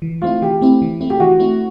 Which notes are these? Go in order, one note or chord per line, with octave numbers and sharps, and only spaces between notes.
E3
A3 C4 E4 F4
E3 G4
A3 C4 E4
E3
A3 C4 E4
G4
E3 F#4
A3 C4 E4